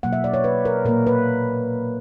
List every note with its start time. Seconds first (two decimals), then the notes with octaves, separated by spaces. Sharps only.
0.03 B2 F#3 A#3 F#5
0.13 E5
0.24 D5
0.34 C#5
0.44 B4
0.65 A#4
0.85 A#2 A#3 A#4
1.07 B4